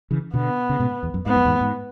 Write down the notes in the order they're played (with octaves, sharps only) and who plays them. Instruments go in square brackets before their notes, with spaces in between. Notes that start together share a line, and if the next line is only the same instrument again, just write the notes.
[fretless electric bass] C#3 E3
[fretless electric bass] B2 D3 [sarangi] B3
[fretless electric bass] C#3
G#2 B2
E2
F#2
[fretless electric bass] G#2 [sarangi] B3
[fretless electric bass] F#2
E2 G#2
G#2